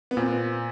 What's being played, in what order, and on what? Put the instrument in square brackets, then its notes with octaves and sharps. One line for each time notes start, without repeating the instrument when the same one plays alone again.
[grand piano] B3
[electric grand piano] A#2 [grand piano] C4